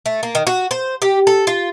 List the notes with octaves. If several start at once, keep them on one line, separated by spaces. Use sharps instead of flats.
A3
A#3
D#3
F#4
C5
G4
A4
F4